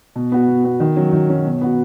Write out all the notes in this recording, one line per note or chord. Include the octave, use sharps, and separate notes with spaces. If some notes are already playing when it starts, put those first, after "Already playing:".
B2
B3 F#4
B2
B3 F#4
D#3
F#3 C#4
D#3
F#3 C#4
B2
B3 F#4